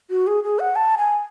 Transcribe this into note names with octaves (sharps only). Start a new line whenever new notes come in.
F#4
G#4
G#4
F#5
A5
G#5